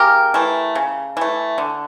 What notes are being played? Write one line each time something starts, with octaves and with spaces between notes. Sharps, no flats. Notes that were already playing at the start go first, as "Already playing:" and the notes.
Already playing: C#3 G4 A#4
E3 A3
C#3
E3 A3
D3